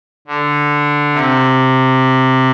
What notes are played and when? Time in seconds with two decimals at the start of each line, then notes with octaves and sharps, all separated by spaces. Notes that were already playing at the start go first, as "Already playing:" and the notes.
0.28 D3
1.13 C3